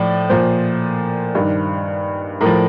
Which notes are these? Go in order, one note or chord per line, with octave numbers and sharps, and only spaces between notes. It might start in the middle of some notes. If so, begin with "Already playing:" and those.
Already playing: A2 F3 D5
A#2 F3 C5
G2 D#3
A2 F3 A#4